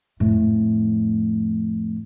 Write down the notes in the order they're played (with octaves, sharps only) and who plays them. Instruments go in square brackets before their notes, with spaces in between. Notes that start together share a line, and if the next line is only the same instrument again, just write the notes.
[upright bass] F2 A2